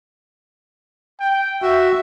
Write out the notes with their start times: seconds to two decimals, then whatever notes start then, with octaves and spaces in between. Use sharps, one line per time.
1.20 G5
1.62 F#4 E5